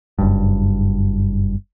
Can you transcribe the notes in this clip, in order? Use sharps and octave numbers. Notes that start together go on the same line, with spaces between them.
F#1 G2